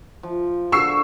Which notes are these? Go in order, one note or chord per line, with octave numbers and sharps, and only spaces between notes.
F3
D3 C#6 E6 C7